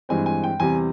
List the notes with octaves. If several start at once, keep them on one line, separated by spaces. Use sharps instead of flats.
G2 E3 G#3 C4 G#5
G#5
G5
E2 C3 G3 C4 G#5